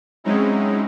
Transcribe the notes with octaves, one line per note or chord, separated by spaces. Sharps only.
F#3 G#3 C4 C#4 D#4 E4